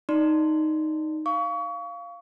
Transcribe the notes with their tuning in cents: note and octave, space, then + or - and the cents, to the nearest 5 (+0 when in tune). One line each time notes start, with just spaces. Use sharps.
D#4 +0 D5 -5 C6 -5
F5 -5 C#6 +30